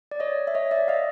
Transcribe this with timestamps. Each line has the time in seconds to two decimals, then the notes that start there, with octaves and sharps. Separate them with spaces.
0.11 D5
0.20 C#5 D#5
0.47 E5
0.55 C#5 D#5
0.71 D5 E5
0.88 D#5 F5